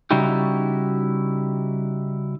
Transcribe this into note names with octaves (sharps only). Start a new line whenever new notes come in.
C#3 G3 D#4 E4 F#4 G4